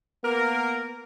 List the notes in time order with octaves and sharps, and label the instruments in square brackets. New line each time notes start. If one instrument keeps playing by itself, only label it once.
[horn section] A#3 A#4 [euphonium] B3